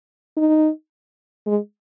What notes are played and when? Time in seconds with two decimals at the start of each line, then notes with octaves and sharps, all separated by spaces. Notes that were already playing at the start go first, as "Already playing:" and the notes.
0.37 D#4
1.47 G#3